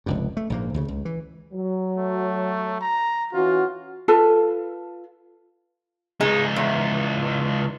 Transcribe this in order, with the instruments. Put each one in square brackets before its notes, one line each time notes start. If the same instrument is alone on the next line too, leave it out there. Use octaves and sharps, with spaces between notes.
[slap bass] F1 C#2 G2
A3
A#1 G#2 A#3
D2 C#3
C#2
E3
[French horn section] F#3
[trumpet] A3
A#5
[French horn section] E3 C#4 F#4 [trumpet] F4
[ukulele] F4 A4 B4 A5
[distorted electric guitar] C#2 D#4 [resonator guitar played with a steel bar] G#3
[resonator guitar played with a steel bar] E2